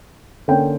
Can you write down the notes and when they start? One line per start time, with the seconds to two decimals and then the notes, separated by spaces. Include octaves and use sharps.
0.48 D3 A#3 C#4 G5